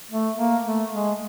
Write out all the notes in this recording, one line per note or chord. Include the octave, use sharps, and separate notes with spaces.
A3
A#3
A3
G#3